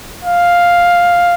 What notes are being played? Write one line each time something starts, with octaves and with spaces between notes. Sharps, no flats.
F5